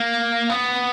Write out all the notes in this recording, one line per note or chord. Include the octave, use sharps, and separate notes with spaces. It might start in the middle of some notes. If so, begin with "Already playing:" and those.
Already playing: A#3
B3